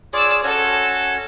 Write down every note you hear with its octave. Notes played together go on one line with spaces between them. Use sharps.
F4 G#4 C#5 D5 E6
C#4 F#4 A4 C#5